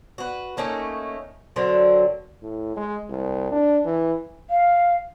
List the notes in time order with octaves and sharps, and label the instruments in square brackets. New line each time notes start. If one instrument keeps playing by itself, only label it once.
[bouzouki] F#4 B4
A3 A#3 C#4 D#4
D3 F#3 C4 A#4
[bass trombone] A2
G#3
C2
D4
E3
[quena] F5